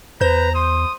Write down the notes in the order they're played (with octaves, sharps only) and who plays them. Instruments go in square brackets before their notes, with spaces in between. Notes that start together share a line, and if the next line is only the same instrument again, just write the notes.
[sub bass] E2 [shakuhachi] B4 [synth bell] C5 G6 [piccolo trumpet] A#5
[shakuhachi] C6 [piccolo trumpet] D#6